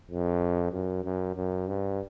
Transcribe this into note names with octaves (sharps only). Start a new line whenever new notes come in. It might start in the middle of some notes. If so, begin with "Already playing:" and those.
F2
F#2
F#2
F#2
G2